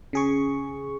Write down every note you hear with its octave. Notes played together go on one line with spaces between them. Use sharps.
C#3 G#4 C#6